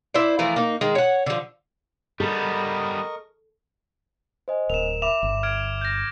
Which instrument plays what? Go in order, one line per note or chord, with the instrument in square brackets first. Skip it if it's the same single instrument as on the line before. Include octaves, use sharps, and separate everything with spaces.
[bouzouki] E4 C5 D5
E3 F3 A3 A#4
A#3 D#4
D#3 G#3
C#5 F#5
D3 F3
[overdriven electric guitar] G3 B3 [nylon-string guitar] A4 [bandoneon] A#4 D#5 C#6
[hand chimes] C5 D#5 G#5
[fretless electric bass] D1 [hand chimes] A#4 [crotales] E7 F7
[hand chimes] E5 B5 [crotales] D6 E7 F7
[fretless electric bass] G1
[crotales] F6 G#6 D7
G6 A#6